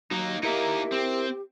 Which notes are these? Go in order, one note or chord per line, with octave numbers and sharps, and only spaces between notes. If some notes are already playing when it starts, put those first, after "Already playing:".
F#3 A#3 D#4 F#4
A#3 D#4 E4 G4 A#4 E5
C4